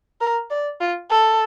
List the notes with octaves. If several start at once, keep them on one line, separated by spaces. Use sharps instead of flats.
A#4
D5
F4
A4